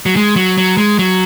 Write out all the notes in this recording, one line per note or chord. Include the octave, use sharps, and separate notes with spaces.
F#3
G#3
F#3
F#3
G#3
F#3